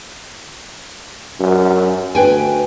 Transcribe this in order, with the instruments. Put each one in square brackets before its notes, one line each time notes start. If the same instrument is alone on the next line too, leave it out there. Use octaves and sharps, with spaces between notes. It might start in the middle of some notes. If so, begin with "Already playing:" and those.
[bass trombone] F#2
[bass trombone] D2 [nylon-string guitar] B4 G5 G#5